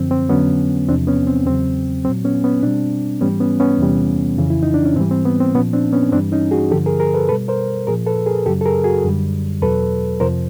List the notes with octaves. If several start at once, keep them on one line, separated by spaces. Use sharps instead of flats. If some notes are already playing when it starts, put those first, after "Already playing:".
Already playing: F#2 D3 F3 C4
C4
F2 D3 F#3 B3 C#4
E2 C3 F3 C4 D4
B3 C#4
C4
E2 C#3 F#3 C4
A#2 F#3 C4
B3 C#4
B3 C#4
B2 G3 C4 D4
G#2 E3 G3 B3 C#4
B3 C#4
B3 C#4
E2 C3 E3 G3
F2 C#3 E3
E4
D#4
D4
C#4
G#2 E3 G3 C4
C4
B3
C4
A#2 F3 B3 C#4
C4 D4
B3 C#4
G2 E3 G3 C4 D4
C#4 D#4
F#4 G#4
G2 D3 F3 G4 A4
G#4 A#4
G#4 A#4
A4 B4
B2 G3 A4 B4
A#4 C5
A#2 F3 G#4 A#4
A4 B4
G#4 A#4
F#2 C#3 F#3 G4 A4
A4
G#4 A#4
F#4 G#4
F#2 D3 G3
E2 B2 F#3 A4 B4
F2 C3 F3 A#4 C5